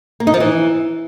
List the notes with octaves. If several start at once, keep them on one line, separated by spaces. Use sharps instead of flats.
A#3
D#4
F3
E3